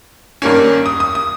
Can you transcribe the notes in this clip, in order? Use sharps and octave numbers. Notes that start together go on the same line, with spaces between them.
G2 D#3 A#3 C#4
D#6
D#6
D#6